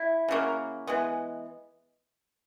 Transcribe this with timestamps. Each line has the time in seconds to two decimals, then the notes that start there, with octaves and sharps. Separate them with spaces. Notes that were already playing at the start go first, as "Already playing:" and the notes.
Already playing: E4
0.28 C#3 F#3 A#3
0.87 E3 G#3 B3